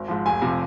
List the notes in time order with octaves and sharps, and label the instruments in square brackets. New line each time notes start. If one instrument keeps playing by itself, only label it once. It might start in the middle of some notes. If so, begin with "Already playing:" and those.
Already playing: [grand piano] G#1
G#2 F3
F1 G#5
C3 F3